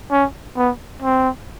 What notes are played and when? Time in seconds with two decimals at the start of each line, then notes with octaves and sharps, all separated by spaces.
0.11 C#4
0.56 B3
1.02 C4